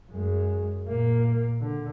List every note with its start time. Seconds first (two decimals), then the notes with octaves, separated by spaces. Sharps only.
0.10 F#2 G#3
0.86 A#2 A#3
1.60 D3